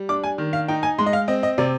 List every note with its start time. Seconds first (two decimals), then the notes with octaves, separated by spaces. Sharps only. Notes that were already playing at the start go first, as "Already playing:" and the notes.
Already playing: G3
0.09 D4 D6
0.24 G#5
0.38 D#3
0.53 F5
0.68 D#4 G5
0.83 G#5
0.99 G#3 C6
1.06 D#5
1.13 F5
1.28 C4 D#5
1.43 D#5
1.58 C3 D5